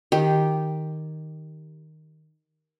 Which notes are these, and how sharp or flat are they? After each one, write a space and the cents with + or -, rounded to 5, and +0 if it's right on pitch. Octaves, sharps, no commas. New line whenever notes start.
D#3 +0 G4 +0